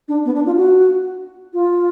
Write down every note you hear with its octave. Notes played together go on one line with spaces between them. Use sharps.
D4
B3
D4
F4
F#4
F4